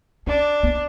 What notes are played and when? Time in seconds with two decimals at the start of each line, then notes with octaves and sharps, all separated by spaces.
0.27 C#4 D4
0.63 B3